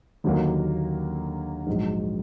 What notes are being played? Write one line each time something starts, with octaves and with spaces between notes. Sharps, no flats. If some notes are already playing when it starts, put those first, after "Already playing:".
D#2 D3 F#3 A#3
A#1 G#2 F#3